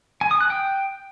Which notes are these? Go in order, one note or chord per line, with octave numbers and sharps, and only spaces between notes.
G#5
D#6
F#6
G5